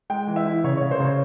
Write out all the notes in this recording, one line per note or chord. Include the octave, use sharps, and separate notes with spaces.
G#3 G5
E3
E5
E4
C#3 C#5
C#3 C#5
C5
C#3 C#5